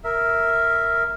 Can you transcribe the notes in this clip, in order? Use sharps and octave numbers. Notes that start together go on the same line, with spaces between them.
A#4 E5